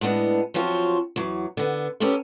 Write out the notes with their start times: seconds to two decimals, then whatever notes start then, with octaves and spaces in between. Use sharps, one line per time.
0.01 A2 G#3 B3 D4
0.54 F3 F#3 C4 F4 F#4
1.16 E2 F#3
1.57 D3 B3
2.00 B3 C#4 G4 A4 A#4